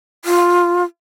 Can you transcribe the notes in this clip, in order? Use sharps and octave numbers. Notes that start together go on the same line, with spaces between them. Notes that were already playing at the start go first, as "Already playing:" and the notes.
F4